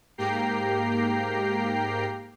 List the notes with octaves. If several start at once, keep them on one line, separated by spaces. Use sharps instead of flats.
G#2 A#3 G4 G5 A#5 C7